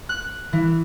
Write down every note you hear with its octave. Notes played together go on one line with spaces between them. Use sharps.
F#6
E3